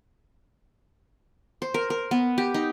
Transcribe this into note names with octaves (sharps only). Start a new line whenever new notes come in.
C5
A#4
A#4
B3
G4
D#4